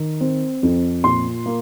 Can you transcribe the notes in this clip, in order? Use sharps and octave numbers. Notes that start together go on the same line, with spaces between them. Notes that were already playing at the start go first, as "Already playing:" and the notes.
Already playing: D#3
C4
F2
A#2 C6
A#3